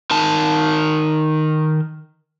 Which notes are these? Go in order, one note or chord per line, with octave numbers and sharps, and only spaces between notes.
D#3 A5